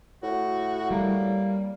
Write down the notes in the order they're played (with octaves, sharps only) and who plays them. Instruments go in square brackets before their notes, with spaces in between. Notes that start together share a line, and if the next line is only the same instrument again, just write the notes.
[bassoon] A2 [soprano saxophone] F#4
[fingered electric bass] G3 [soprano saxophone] A#3